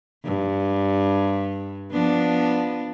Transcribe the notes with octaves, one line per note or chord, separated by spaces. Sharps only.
G2
F3 B3 D4